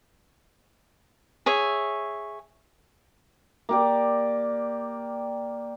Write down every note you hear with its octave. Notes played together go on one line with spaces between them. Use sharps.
G#4 C#5 E5
A#3 G4 D5